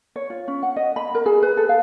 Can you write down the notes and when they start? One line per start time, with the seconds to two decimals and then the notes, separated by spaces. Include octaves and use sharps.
0.16 C#5
0.30 F4
0.48 C#4
0.63 F#5
0.76 D#5
0.96 B5
1.15 A#4
1.26 G#4
1.43 B4
1.57 A4
1.69 F5